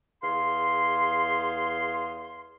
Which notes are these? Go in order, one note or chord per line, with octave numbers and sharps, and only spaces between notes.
E2 G#4 F5 C6